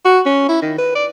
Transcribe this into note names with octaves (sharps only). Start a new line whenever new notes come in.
F#4
C#4
E4
D#3
B4
D5